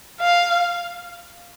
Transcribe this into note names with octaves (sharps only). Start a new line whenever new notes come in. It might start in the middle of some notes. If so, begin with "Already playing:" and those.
F5